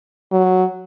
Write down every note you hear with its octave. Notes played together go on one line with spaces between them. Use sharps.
F#3